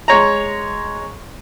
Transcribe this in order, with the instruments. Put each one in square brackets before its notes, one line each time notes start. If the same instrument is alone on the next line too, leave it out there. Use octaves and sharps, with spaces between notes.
[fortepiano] G#3 C#5 A#5